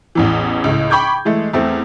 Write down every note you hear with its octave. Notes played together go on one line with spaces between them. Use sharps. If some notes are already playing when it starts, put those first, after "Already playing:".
A1 E2 E3
C#2 A2
G5 B5 C#6 D6 G6 G#6
E3 G#3 A3
E2 A3 C4